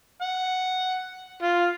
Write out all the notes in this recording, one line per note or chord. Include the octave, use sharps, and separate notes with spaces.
F#5
F4